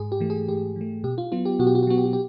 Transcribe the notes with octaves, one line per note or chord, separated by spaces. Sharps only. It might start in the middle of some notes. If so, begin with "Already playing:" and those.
Already playing: G#2 G#4
G4
E3 A3
G#4
G#2 G4
E3 A3
B2 G4
F4
F#3 B3 F4
G4
B2 F#4
G4
F#4
G4
F#3 B3 F#4
G4
F#4
G4